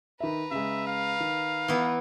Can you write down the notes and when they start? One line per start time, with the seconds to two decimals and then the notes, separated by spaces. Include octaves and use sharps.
0.20 D#3 B4 E5 A#5
0.51 C#3 G#3 E5
0.87 F5
1.20 D#3
1.68 E3 B3